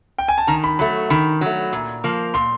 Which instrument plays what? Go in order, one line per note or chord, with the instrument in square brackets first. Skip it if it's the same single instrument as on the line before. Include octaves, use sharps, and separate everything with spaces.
[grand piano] G5
G#5
A5
[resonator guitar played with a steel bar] D#3 [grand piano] A#5
[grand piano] B5
[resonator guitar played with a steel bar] F#3 A3 [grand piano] B5
[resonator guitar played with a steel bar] D#3 [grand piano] B5
[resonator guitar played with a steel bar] F#3 A3
A#2
F3 A#3
[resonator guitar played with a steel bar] A#2 [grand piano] C6